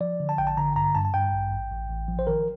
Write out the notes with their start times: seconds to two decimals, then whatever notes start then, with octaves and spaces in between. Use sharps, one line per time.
0.01 F3 D5
0.20 D3
0.29 A5
0.38 A1 G5
0.47 A5
0.57 D3 A#5
0.76 G2 A#5
0.95 G2 A5
1.05 A5
1.14 G2 G5
1.33 A1
1.52 A1
1.71 A1
1.89 A1
2.08 F3
2.19 C5
2.27 D#3 A#4